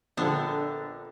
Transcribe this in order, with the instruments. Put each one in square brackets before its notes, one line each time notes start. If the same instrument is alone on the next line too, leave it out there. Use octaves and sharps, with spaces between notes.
[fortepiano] A#1 A4 [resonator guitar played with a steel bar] D3 [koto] B3 C4 D4